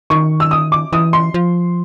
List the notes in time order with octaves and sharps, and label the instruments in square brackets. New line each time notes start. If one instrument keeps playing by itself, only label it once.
[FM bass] D#3 [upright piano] C#6
[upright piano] E6
D#6
D6
[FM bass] E3 [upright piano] D#6
[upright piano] C6
[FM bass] F3